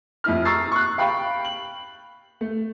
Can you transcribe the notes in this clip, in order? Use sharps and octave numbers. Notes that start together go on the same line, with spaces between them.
F2 E4 F6
A#5 C#6 E6 A6 C7
C#6 F#6
F5 G5 B5 C#6
F#7
A3